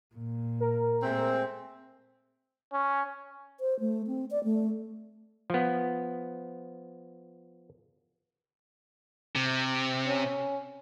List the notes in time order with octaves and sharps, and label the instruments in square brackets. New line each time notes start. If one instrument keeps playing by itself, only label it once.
[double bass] A#2
[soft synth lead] A#4
[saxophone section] G#3 A3 C4
[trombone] C#4
[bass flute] C5
A3
C4
D5
A3
[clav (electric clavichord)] F3 B3
[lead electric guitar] C3
[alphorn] C#4